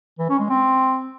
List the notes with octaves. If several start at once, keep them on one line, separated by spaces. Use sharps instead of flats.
E3
C#4
G#3
C4